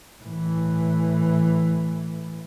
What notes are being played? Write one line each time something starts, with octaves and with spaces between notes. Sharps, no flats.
A2 E3